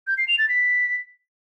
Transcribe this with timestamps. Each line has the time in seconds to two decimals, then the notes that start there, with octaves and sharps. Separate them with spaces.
0.07 G6
0.18 C7
0.28 F7
0.38 A6
0.49 B6